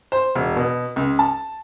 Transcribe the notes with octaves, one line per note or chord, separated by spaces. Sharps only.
C5
E1
B2
C#2
A5